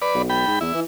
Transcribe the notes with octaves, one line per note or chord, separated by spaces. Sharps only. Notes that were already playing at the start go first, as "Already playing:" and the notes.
B4 D5
B1
G5 B5
G#2
E2 E4
E3